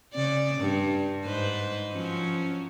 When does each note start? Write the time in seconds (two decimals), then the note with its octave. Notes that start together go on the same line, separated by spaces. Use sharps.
0.14 C#3 D5
0.60 G2
1.24 G#2 B4 C5
1.90 F3 F#3 C#4